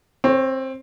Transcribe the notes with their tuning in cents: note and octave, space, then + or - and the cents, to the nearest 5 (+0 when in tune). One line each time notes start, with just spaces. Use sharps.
C4 +15 C#5 -15